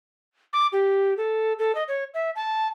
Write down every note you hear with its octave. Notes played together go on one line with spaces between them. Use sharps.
D6
G4
A4
A4
D#5
C#5
E5
A5